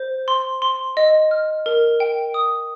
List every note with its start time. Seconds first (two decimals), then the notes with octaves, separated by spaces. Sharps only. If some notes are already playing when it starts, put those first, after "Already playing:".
Already playing: C5
0.28 C6
0.62 C6
0.97 D#5
1.31 F6
1.66 A#4
2.00 G5
2.34 D#6